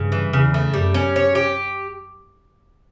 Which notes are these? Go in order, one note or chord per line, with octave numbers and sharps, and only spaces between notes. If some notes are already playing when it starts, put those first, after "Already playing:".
Already playing: G2 C#3
E3
E2 C#3
A3
F#2 G3
C#4
C#5
G4